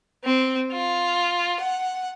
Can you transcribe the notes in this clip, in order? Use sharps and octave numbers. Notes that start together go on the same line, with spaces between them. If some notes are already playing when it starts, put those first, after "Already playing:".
C4
F4
F#5